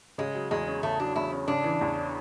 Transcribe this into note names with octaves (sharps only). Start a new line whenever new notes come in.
C#3 G#3
F#3
E2 G#3
C#4
C#3 A3
F#3 D4
E2 E4
C#4
C#3 D4
E3
E2